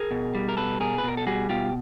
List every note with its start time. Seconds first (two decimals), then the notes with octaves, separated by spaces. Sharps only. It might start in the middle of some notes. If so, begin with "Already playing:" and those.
Already playing: G#4 A#4
0.11 B2
0.35 G3
0.49 A#4
0.57 B2 A4 B4
0.80 B2 G#4 A#4
0.98 B4
1.03 B2 A#4
1.17 A4
1.27 G3 F#4 G#4
1.49 B2 F4 G4